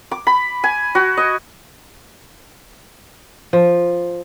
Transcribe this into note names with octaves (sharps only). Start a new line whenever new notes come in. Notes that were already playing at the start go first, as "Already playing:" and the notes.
D6
B5
G#5
F#4
D#5
F3